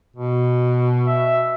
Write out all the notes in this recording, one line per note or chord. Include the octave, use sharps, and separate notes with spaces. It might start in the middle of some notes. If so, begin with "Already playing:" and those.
B2
E5